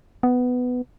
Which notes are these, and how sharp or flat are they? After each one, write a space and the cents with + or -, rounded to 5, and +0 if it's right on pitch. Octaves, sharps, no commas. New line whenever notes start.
B3 +10